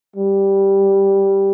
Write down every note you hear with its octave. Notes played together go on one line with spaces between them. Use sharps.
G3